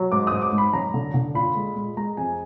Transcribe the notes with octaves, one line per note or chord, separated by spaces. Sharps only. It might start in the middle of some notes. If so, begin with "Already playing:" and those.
Already playing: F#3
G#2 D6
G#2 D#6
D6
G#2
B5
F#2 A#5
D3
D3
A#2 B5
G#3
G#3
G#3 A#5
F2 G#5